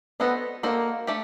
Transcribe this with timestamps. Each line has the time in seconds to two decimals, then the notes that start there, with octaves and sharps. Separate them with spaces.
0.20 B3 D4 F#4 A4 C5 D#5
0.63 A#3 D4 F#4 A4 C5 D#5
1.07 A3 D4 G4